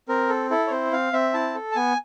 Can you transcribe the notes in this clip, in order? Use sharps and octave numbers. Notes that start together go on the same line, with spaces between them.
C4 A#4
A4
E4 A4
C#5
C4 C5
C4 F5
C4 E5
E4 A5
A4
A5
B3 G#5